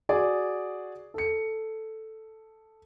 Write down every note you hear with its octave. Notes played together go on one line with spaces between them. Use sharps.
F#4 G#4 D5
A4 C#7